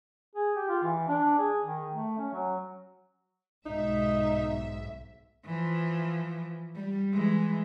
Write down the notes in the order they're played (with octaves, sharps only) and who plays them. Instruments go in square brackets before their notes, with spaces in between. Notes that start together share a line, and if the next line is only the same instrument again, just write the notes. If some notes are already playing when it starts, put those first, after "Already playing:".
[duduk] G#4
G4
F4
E3
D4
G#4
D#3
A3
C#4
F#3
[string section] B1 G#2 E5 [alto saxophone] D#4
[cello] E3 F3
G3
E3 G#3